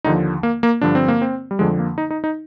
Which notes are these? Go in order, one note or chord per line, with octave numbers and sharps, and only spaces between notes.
D#2 D3 F3 D#4
A#3
A#3
G2 D3 F3 D4
C4
A#3
C4
G3
F2 D3 F3 G#3
A#3
D#4
D#4
D#4